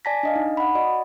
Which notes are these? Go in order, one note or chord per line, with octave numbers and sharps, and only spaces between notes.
D5 G#5 A5 A#6 B6
D4 D#5 F5
D#4
F#5 B5
F#4 D5 D#5